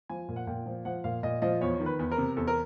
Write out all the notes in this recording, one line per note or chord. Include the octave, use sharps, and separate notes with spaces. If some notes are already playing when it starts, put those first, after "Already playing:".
F3 G#5
A#2
F#5
A#2 G5
F3
F3 F#5
A#2 F5
A#2 D#5
F3 D#5
E2 C#5
D#3
B4
E2
A#4
C3
E2 A4
A#4